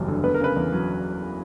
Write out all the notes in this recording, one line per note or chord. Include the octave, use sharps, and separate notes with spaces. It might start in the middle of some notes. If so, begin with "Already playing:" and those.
Already playing: F#1 E2 G3
D3
B3 B4
A#4
C#3 B4
E2
F#3